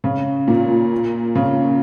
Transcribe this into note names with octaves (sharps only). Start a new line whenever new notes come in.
C#3
A#2
C#3